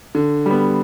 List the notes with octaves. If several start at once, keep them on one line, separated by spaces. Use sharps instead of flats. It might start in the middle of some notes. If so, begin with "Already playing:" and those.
D3
G3 B3